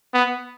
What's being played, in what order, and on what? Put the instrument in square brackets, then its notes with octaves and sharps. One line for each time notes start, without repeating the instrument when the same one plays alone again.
[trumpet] B3